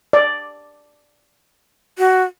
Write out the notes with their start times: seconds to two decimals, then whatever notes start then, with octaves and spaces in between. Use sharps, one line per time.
0.13 D5
1.99 F#4